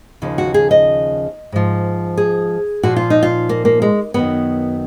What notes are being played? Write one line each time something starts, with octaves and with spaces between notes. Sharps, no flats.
D#2 C#3 F3
F#4
G#4
D#5
G#2 F3
G#4
A#2 F3 F#4
F4
D#4
F4
A#3
A#3
G#3
F#2 D#3 F#3 B3